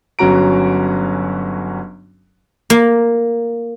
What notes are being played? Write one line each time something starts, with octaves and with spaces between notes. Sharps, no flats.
G1 F#3 C#4 F#4 A#5 D7
A#3